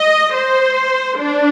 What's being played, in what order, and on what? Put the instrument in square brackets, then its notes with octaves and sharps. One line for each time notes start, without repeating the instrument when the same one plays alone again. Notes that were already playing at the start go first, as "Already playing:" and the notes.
Already playing: [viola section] D#5
C5
D4